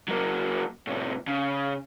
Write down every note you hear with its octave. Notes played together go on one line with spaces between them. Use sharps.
F#3 A#3
A2 C3
C#3